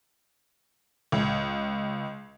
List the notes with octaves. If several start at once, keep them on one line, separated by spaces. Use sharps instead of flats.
C#2